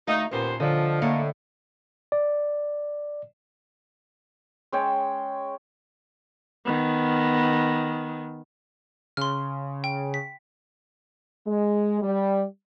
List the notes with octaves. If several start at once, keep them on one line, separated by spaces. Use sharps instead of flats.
D2 A3 D#4 F5
D#2 A#2 B3 C#4 C5
D3 F3 D#5
A2 A#3 F5 F#5
D5
G#3 C#4 C#5 G5
D#3 B3
C#3 C6 F6
G5
B6
G#3
G3